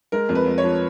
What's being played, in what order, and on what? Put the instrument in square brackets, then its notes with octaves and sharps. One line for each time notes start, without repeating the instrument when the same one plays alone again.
[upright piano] G#3 A#4
F2
B4
F2
C#5
F3